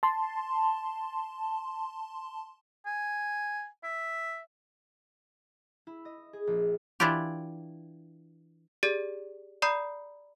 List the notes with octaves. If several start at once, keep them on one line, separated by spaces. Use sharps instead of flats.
A5 C6
G#5
E5
E4
D#5
G#4
A#1
E3 D4 E4 F4 G4
G4 G#4 D5 A6
D5 A#5 B5 D#6 G6 C7